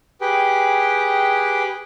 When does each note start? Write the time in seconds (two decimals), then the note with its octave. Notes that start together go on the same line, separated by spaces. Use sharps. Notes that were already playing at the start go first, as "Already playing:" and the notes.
0.21 G4 G#4 B4 G5